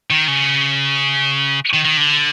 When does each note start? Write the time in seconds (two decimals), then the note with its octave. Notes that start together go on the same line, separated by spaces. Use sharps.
0.10 D#3
0.28 C#3
1.73 D#3
1.85 D#3
1.97 D3